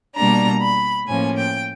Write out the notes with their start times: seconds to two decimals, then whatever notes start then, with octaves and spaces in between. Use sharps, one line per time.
0.15 B2 G3 A#3 D4 A#5
0.61 B5
1.06 A2 F3 A#3 C#4 G#5
1.37 G5